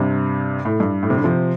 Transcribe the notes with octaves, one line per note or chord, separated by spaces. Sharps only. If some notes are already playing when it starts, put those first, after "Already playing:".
Already playing: G2 C3
A2
G2
A2
C3
D3
C3 F3